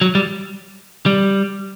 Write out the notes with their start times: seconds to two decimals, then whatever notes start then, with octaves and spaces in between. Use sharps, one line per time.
0.01 F#3
0.15 G3
1.06 G3